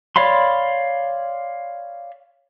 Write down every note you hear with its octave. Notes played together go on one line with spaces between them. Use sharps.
C#5 D5 F5 B5 C6